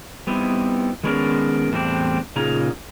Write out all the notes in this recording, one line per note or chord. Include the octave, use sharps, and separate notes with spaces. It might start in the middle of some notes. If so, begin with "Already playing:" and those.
G3 B3 C4 D#4 E4
D#3 G#3 B3 C#4 D4 A#4
E2 A2 G3 C4 D4
A#2 C#3 D#4 F4 G#4 A#5